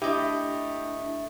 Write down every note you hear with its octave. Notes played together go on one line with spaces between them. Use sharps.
A3 D4 E4 G4 D#5